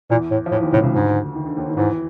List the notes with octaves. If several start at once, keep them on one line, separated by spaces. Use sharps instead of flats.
E2 A#2 E3
A2
F3
E2 A2 E3
D#2 D#3
C#2 A2 C#3
C#2 C#3
D2 G#2 D3
D#3
D3
D#2 D#3
D#3
E2 G#2 E3